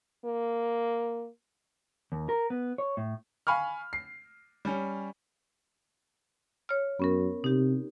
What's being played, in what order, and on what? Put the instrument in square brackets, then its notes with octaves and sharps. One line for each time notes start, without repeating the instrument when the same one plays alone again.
[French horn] A#3
[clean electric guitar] D#2
A#4
B3
C#5
A2
[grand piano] F5 G#5 B5 C#6 F6
C7
G3 C#4
[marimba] C#5 F6
[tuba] F#2 [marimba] B3 C#4 A#4
[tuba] C3 [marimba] D#4 G4